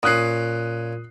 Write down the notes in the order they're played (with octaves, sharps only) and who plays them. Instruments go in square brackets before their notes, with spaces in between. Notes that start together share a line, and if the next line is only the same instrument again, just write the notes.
[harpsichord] A#2 C#4 [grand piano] D#6 F#6 C7